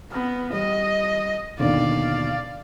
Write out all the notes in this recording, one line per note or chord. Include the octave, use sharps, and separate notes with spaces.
B3 F6 A#6
G3 D#5
D#2 B2 D3 D5 F5